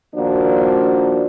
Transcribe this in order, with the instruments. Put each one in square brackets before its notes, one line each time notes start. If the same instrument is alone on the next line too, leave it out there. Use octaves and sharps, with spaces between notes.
[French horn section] D#3 F3 A#3 D4 F#4